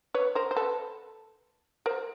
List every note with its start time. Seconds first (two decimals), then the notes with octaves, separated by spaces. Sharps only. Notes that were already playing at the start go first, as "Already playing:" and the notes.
0.14 B4 C#5
0.35 A#4 C5
0.51 C5
0.56 A4 B4
1.86 A#4 C5